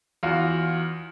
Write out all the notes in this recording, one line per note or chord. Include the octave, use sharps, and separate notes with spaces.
E2 F4 F#4 F5